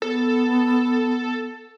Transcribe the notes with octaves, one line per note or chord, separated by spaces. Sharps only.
B3 A4